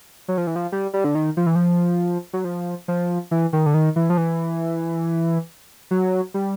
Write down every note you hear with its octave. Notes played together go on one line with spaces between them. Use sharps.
F#3
F3
E3
F3
G3
G3
D3
D#3
F3
E3
F3
F#3
F3
F3
E3
D#3
D3
D#3
E3
F3
E3
F#3
G3